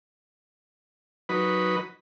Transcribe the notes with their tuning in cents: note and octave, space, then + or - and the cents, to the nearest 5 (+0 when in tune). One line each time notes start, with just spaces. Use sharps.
F#3 -5 D#4 +0 B4 +0